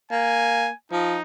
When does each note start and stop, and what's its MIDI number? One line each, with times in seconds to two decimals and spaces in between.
0.11 0.67 58
0.11 0.74 80
0.92 1.17 53
0.92 1.22 63